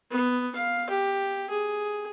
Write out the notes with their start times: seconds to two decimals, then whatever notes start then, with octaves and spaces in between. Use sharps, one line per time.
0.11 B3
0.55 F5
0.90 G4
1.50 G#4